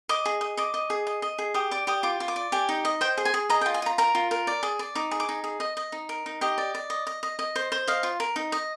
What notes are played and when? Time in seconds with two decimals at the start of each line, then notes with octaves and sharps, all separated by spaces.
0.09 D#5 D6
0.25 G#4
0.41 D#5
0.57 D#5 D6
0.74 D#5
0.90 G#4
1.07 D#5
1.22 D#5
1.38 G#4
1.54 G4 D#6
1.71 D5 D6
1.87 G4 D#6
2.03 F4 D6
2.20 F4
2.28 D6
2.36 D5
2.52 G4 G#5
2.69 D#4
2.85 D#5
3.01 C5 G5
3.17 G#4
3.25 G#5
3.34 G#4
3.50 D#5 A#5
3.61 G5
3.66 F4
3.74 G#5
3.82 F4 A#5
3.98 A#4 A#5
4.15 F4
4.31 A#4
4.47 D5
4.63 G#4
4.79 D5
4.95 D#4 D6
5.11 G#4
5.20 D6
5.29 D#4
5.44 G#4
5.60 D#5
5.77 D#5
5.92 D#4
6.09 A#4
6.26 D#4
6.41 G4 D#5
6.58 D5
6.75 D5
6.90 D#5
7.07 D#5
7.23 D#5
7.39 D#5
7.56 C5
7.72 C5
7.87 D#5 F5
8.03 F4
8.20 A#4
8.36 D#4
8.52 D#5